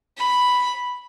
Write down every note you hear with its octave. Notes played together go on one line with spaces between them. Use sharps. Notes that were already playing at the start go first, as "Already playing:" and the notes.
B5